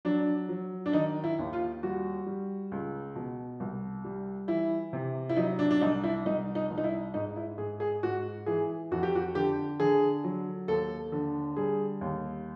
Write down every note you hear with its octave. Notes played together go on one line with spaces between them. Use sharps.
F#3 D4
F#3
D4
D#3 D#4
E4
D#2
F4
G3 F#4
G3
C#2
B2
C2
G3
E3 E4
C3
E4
F#3 D#4
D4
D4
C2 D#4
E4
C2 D#4
D#4
C2
D#4
E4
G#2 D#4
E4
G#2 G#4
G#4
G#2 F#4
E3 G#4
F2 F#4
G4
F#4
D3 G4
D3 G#4
F#3
D#2 A4
D3
G3 G#4
D#2